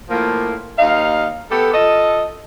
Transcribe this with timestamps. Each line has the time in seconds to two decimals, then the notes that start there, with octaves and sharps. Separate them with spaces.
0.10 A2 F3 A#3
0.79 D#2 D#4 F5
1.50 B3 G4 A4
1.73 F4 A4 D#5